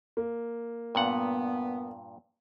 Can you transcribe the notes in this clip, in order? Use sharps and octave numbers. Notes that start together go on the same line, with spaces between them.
A#3
G2 A#2 B3 F#5